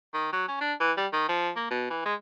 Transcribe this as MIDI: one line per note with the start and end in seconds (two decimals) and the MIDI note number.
0.14 0.31 51
0.33 0.48 54
0.48 0.56 61
0.60 0.73 62
0.80 0.92 52
0.97 1.07 55
1.13 1.24 51
1.29 1.50 53
1.56 1.69 58
1.71 1.86 47
1.90 2.05 52
2.06 2.14 56